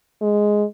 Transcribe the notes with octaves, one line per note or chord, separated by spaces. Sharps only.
G#3